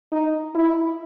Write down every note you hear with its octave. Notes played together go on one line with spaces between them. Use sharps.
D#4
E4